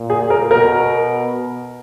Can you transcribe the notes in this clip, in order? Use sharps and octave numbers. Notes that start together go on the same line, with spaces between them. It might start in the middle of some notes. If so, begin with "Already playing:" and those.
Already playing: A#2
G#4
A#4
B2 A#4